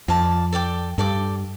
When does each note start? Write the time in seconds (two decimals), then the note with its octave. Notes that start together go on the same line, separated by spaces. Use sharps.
0.08 F2 F4 D5 A5 D6
0.53 A4 D5 G5 D6
0.98 G2 A4 D5 G5 D6